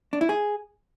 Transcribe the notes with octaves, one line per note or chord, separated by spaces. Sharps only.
D4
E4
G#4